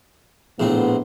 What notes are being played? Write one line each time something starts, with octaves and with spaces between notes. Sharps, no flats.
A#1 A2 B3 C4